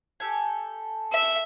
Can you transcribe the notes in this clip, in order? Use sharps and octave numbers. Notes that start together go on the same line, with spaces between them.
G4 A4 G#5
E5